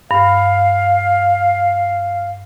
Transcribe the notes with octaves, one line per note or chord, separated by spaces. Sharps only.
G2 F5